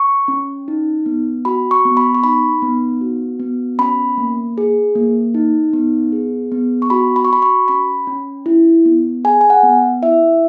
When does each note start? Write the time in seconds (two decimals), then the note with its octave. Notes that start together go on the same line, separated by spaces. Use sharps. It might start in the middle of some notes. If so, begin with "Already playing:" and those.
Already playing: C#6
0.28 C#4
0.68 D#4
1.06 B3
1.45 F#4 B5
1.71 C#6
1.85 B3
1.97 B5
2.15 C#6
2.23 D#4 B5
2.62 B3
3.01 F#4
3.40 B3
3.79 C#4 B5
4.17 A#3
4.58 G#4
4.95 A#3
5.34 D#4
5.73 B3
6.12 G#4
6.52 B3
6.82 C#6
6.90 F#4 B5
7.16 B5
7.25 C#6
7.30 F#4 B5
7.42 C#6
7.68 C#4 B5
8.07 C#4
8.46 E4
8.86 B3
9.24 G#4 G#5
9.41 G#5
9.50 F#5
9.63 B3
10.02 E4 E5